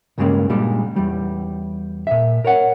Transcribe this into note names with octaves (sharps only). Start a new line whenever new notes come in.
C#2 G2 C#3 G3 G#3 A#3
A#2 G3 G#3 D4
E2 G3
A#2 E5
A#4 C#5 F#5